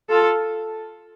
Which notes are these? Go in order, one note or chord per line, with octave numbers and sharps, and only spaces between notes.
F4 A4